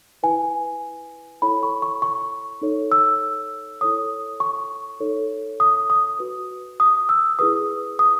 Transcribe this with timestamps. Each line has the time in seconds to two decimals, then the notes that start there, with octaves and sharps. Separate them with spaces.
0.23 E4 B4 G#5
1.42 E4 A4 C#5 B5
1.63 C#6
1.82 C#6
2.02 C#6
2.62 D#4 A4 C#5
2.92 E6
3.81 E4 A4 C#5 D#6
4.40 C#6
5.00 D#4 A4 C#5
5.60 D#6
5.90 D#6
6.19 F#4 B4
6.80 D#6
7.09 E6
7.39 E4 G#4 B4 D#6
7.99 D#6